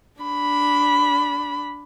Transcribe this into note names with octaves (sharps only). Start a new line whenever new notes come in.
D4 B5